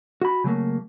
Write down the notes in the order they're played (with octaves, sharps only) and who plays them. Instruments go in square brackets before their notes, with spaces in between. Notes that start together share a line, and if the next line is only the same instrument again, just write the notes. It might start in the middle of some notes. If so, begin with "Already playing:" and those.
[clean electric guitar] F#4 B5
C#3 F#3 A3 A#3